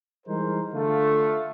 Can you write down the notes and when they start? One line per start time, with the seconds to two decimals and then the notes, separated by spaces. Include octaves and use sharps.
0.27 E3 G3 G#3 D#4 A#4 C5
0.73 D3 A3 F4